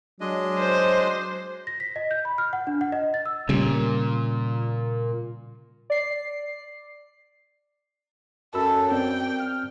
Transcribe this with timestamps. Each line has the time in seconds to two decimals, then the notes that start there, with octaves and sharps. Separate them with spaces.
0.20 F#3 G#3 D4 D#5
0.58 C5
1.67 A#6
1.80 B6
1.96 D#5
2.11 G6
2.25 B5
2.38 F6
2.53 F#5
2.67 D4
2.81 F#5
2.92 D#5
3.14 A6
3.26 E6
3.49 A#2 C#3 G3
5.90 D5 C7
8.55 F#2 A4 B5 E6
8.92 C4 D5 G5
9.39 F6